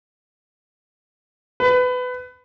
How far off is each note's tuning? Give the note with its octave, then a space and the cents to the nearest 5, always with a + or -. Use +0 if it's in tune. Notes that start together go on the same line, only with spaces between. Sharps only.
B4 +20